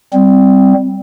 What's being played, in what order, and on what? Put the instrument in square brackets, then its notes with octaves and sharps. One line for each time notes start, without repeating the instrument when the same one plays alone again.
[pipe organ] G3 C4